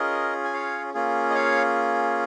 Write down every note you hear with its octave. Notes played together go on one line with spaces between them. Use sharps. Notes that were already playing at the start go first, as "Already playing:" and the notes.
Already playing: C#4 F4 G#4 A#4 D#5
G#5
C#5 F5
A#3 C#4 F4 G#4
D#5
C#5 F5